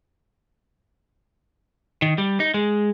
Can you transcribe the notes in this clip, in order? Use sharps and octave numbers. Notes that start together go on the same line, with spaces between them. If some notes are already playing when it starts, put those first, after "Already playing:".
D#3
G3
D#4
G#3